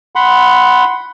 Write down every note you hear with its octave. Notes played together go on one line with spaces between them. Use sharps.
F#5 B5 C6